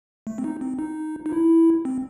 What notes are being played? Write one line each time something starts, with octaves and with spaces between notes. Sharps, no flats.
A3
C4
D#4
C4
D#4
D#4
E4
C4